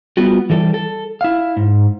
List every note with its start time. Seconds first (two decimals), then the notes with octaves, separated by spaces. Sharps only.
0.17 G3 B3 F4 F#4
0.50 E3 G3 A4
0.74 A4
1.21 E4 F5
1.57 G#2